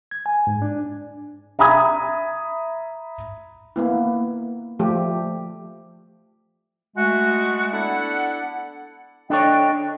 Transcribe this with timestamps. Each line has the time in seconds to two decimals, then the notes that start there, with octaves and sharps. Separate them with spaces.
0.11 G#6
0.26 G#5
0.47 G#2
0.62 D4
1.59 E5 A#5 B5 D#6 G#6
3.76 A#3 B3 E4
4.79 F3 A3 G4
6.96 G#3 A3 F#4
7.72 B3 D4 E4 A4 F#5
9.30 D4 A4 C#5 D#5 G5